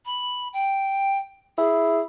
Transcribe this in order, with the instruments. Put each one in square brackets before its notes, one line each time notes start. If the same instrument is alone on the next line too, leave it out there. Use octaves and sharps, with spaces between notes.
[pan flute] B5
G5
[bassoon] E4 [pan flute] G#4